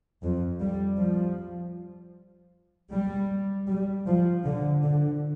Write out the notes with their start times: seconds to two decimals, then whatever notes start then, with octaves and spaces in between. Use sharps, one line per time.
0.23 F2
0.61 G3
0.99 F3
2.91 G3
3.67 G3
4.06 F3
4.45 D3
4.83 D3